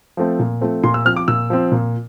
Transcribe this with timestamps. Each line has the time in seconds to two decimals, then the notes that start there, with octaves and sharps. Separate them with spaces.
0.17 F3 A3 C4
0.39 A#2
0.61 F3 A3 C4
0.83 A#2 C6
0.94 E6
1.05 F3 C4 F6
1.16 D6
1.28 A#2 E6
1.50 F3 C4
1.72 A#2